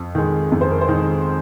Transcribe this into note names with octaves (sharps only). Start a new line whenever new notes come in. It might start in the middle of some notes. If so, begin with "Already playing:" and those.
Already playing: F2
D#3 G#3
F2
C5
A#4
C5
D#3 G#3